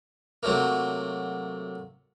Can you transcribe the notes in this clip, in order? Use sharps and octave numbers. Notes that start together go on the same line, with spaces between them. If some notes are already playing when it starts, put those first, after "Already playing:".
C3 F#3 A3 A#3